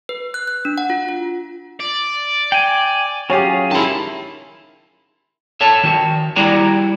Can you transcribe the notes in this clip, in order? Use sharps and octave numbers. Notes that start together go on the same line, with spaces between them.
B4
F#6
F#6
D4
F#5
F4
F4
D5
G5 G#5
F#3 C#4 F4 G4 G#4
D#3 G#3 E4 F#4 A5
A4 C#5 E5 A5
D#3 F#4
G3 E4 F#4 D5 A#5